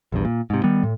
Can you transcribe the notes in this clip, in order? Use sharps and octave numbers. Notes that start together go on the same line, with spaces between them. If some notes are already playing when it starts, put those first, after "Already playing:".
A#1 E2 G2
A#2
G#2 C3
D#3 G3 B3
A2